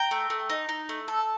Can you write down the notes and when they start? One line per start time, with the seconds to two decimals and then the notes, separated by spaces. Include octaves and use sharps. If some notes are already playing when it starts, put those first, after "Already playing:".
Already playing: G5 A#5
0.11 A3
0.30 A3
0.50 D#4
0.69 D#4
0.89 A3
1.08 A4